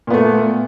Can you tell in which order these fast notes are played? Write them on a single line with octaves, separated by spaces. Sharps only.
A#2 B3 A3